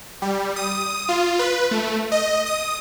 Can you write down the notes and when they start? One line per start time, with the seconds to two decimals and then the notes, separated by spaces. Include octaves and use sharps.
0.22 G3
0.56 D#6
1.09 F4
1.39 B4
1.71 A3
2.12 D#5
2.46 D#6